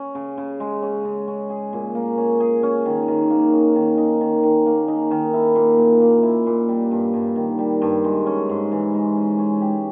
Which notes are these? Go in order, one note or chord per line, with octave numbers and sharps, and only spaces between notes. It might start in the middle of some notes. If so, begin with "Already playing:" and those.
Already playing: C#4
C#3
C#3
G#3
C#4
C#3
C#4
G#4
A#2
A#3
C#4
G#4
C#4
D#3
D#3
A#3
C#4
D#3
D#4
D#3
D#3
A#3
D#4
D#3
E4
A#2
A#2
A#3
E4
A#2
G3
G2
G2
D#3
G3
G2
G#3
C#4
G#2
E3
G#3
C#4
C#4
G4